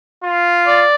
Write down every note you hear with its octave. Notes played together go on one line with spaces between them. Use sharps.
F4
D5